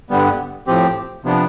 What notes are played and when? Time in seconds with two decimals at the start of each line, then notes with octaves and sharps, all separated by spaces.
0.10 G2 D3 G3 B3
0.67 A2 F3 C4 G4
1.24 C3 F3 B3 D4